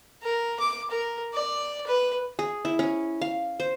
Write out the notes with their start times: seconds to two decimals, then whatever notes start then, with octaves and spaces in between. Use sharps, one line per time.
0.22 A#4
0.59 D6
0.90 A#4
1.34 D5
1.87 B4
2.39 G#4
2.65 E4
2.79 C#4
3.21 F5
3.60 C5